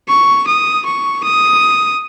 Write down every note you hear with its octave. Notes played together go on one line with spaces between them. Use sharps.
C#6
D#6
C#6
D#6